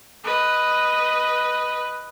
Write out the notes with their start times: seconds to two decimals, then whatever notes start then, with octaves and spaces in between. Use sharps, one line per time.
0.24 B4 D#5